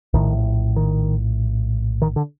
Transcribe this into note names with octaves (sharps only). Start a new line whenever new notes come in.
A#1 A2 D#3
D#3
D#3
D3